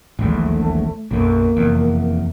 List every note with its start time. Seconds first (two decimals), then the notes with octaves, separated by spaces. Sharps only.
0.19 D#1 A#1 E2 A3
1.11 B1 F#2 A#3
1.57 F1 E2